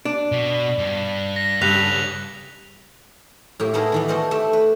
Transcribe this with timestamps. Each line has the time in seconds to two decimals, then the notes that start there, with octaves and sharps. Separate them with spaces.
0.05 D4
0.32 B2
0.79 G2
1.36 A#6
1.61 G2 C#3 A4 F#6 B6 F7
3.60 A2 A#3 G4
3.74 A3 B3 D#4 E4 G#4 A#4
3.92 D#3 E3 B3
4.08 F#4 A4 C5 D5 D#5 F5
4.31 A3 G4 E5
4.53 B4